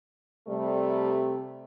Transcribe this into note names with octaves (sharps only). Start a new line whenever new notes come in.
C3 G3 A3